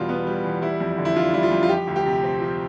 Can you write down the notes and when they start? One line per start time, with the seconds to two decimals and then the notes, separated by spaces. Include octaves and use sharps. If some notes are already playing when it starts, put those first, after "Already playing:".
Already playing: E2 B2 G3 F4
0.09 B3
0.27 G3
0.44 E2
0.62 G3 E4
0.80 F2
0.98 D3
1.05 E4
1.16 D4 F4
1.34 G3 E4
1.43 F4
1.52 F2
1.63 F4
1.69 F3 G4
1.87 D2
1.96 G4
2.06 C3
2.23 C4
2.40 F3